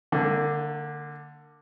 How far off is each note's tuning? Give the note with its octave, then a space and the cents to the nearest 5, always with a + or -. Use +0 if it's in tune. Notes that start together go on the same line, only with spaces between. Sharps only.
D3 +0 A#3 -35